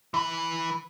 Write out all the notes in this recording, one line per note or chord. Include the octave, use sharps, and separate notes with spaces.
E3 B4